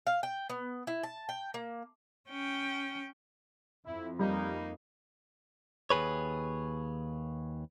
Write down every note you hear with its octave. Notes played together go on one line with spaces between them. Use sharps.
F5
G5
B3
E4
A5
G5
A#3
C#4 G5
F2 E4
G3 A#3 D#4
D#2 A#2 G#4 B4 C#5